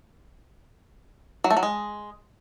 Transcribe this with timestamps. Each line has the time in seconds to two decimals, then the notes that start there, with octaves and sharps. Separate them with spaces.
1.44 F#3
1.50 A3
1.57 F#3
1.63 G#3